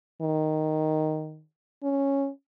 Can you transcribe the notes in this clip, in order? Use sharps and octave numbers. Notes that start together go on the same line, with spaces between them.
D#3
C#4